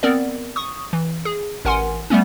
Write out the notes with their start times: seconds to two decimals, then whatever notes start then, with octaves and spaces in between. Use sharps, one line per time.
0.03 B3 C4 A#4 D5
0.56 C#6 D#6
0.93 E3
1.25 G#4
1.65 A1 A#4 F#5 G#5 C6
2.10 G3 A3 B3 C#4